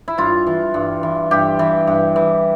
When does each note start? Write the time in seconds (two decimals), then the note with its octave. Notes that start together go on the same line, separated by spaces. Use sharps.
0.08 E4
0.18 G2 F4
0.47 E3
0.74 G2
1.03 E3
1.31 G2 G4
1.59 E3
1.87 G2
2.16 E3